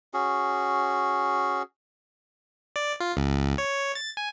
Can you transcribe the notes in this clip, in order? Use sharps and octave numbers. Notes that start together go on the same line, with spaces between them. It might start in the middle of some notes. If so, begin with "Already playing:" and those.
C#4 F#4 G#4
D5
F4
C#2
C#2
C#5
A6
G#5